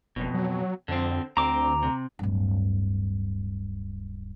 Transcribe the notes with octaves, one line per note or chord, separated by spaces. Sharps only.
F#1 F2 B2
F#3
F2 D3 C4
D2 C4 A#5 D6
C3
D1 G2